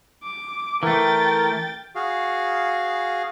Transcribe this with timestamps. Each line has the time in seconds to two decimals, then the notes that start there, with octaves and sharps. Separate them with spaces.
0.23 D6
0.83 E3 A3 A#4 G5 A6
1.95 F#4 G#4 F5